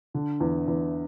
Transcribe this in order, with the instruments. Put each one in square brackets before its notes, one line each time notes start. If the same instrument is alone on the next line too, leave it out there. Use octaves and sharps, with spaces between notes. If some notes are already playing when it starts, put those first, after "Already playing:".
[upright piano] D3
E2
E2